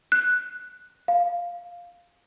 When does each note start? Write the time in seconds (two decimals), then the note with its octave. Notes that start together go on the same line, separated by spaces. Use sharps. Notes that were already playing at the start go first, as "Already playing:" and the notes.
0.12 F#6
1.08 F5